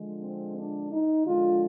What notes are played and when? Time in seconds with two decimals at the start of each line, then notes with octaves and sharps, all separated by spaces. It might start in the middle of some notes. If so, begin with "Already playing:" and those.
Already playing: D3 F3 G#3
0.23 C4
0.58 D4
0.92 D#4
1.27 D3 F3 G#3 F4